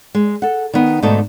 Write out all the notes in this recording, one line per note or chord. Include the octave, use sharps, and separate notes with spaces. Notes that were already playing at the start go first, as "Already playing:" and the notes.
G#3
A4 F#5
D#3 B3
G#2 B2 D3 A3 D#4 A5